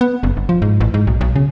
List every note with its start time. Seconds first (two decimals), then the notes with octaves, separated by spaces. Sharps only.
0.01 B3
0.23 F#1
0.37 G1
0.49 F3
0.62 G#2
0.80 A1
0.94 G#2
1.07 B1
1.21 B1
1.36 C#3